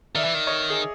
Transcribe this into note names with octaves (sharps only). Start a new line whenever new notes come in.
D#3 D5 E5
E3
D#3
C#5 D#5
G#4